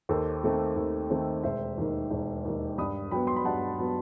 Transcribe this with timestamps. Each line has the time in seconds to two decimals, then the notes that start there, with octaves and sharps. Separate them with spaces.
0.09 D#2 A4 C5
0.43 D#3 A3 C4
0.76 D#2
1.10 D#3 A3 C4
1.43 E1 C5 E5
1.77 D#2 D#3
2.11 E1
2.45 D#2 D#3
2.78 G2 B5 D#6
3.11 F#3 B3 G5 B5
3.27 C6
3.36 B5
3.45 G2 F#5 A5
3.79 F#3 B3